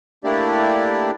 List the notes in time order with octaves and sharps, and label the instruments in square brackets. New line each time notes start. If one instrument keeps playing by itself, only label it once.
[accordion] A3 A#3 D4 E4 G4 D5